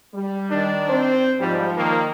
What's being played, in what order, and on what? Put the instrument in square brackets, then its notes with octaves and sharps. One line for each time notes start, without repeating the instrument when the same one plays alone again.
[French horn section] G3
[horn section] D#3 D4
[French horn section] C4 C5
[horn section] G#2 G3 [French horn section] F3
[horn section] D#3 A#3